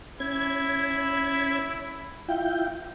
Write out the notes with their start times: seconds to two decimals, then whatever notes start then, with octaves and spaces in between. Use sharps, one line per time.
0.20 C#4 E4 G#6
2.28 E4 F4 G5